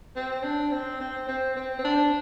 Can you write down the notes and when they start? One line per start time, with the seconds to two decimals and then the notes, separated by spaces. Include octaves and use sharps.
0.16 C4
0.43 D4
0.72 C4
1.01 C4
1.28 C4
1.56 C4
1.79 C4
1.84 D4